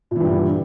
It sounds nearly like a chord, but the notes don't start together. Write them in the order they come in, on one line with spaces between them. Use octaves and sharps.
A#2 E3 G2 G3 D3